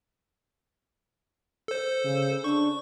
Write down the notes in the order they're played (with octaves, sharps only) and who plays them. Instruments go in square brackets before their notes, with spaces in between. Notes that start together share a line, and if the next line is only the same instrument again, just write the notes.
[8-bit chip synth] A4 C5
[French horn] C#3
[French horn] D4 [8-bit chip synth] C#6